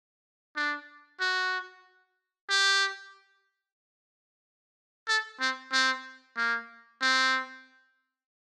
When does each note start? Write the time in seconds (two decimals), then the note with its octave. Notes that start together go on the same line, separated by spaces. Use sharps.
0.56 D4
1.20 F#4
2.50 G4
5.08 A4
5.40 C4
5.72 C4
6.37 A#3
7.02 C4